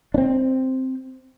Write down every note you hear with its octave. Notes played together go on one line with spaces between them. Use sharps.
C4 D4